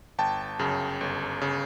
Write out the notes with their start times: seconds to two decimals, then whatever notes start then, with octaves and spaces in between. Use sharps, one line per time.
0.18 G1 G5 A5
0.59 F#2 C#3
1.01 G1
1.42 C#3